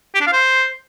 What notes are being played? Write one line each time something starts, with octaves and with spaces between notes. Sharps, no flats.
G4
D4
F5
C5